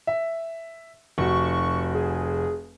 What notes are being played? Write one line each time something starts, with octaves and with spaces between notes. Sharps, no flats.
E5
F1 F#4 C#6
G#4